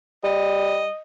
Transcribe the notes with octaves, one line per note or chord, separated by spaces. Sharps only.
G3 D#5